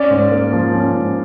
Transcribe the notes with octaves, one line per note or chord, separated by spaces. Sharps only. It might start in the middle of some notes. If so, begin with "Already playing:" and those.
Already playing: C#4 D5
G#2
A#3
F3
C#4
G#2